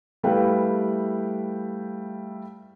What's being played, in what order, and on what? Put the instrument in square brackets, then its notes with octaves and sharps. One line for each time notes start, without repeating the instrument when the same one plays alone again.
[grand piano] G3 A3 E4 B4 F5 G5